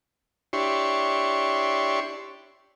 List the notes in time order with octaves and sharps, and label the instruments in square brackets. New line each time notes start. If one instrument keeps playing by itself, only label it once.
[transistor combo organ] D4 E4 G4 C#5 C6 C#6